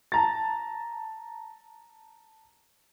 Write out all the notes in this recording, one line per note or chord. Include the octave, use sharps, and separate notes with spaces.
A5 A#5 A6